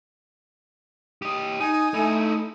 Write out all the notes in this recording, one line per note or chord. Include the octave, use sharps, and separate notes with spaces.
G4 D#5
D#4 G#5
A3 D#4 E4